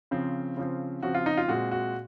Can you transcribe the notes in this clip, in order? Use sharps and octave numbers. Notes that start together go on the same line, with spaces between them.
C#3 F3 C4
C#3 F3 C4
C#3 F3 C4 F#4
F4
D#4
F4
A#2 G#3 C4 F#4
F#4